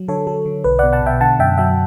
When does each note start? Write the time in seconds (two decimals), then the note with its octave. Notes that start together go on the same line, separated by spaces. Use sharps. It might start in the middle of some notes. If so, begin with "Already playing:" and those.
Already playing: F#3
0.08 D3 A4 C#5
0.27 F#3 A4
0.46 D3
0.64 B1 B4
0.79 B2 D5 F#5
0.93 F#5 A5
1.02 B2 E5 G5
1.21 D3 F#5 A5
1.39 F#2 E5 G5
1.58 F#3 E5 G5